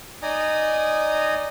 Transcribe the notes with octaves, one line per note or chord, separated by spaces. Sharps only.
D#4 D5 D#5 G#5 A#5 D#6